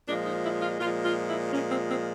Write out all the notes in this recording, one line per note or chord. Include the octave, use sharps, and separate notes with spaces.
A#2 F3 G#3 D4
D#4
E4
F4
A#2 F3 G#3 F4
F4
E4
A#2 F3 G#3 C#4
C4
C4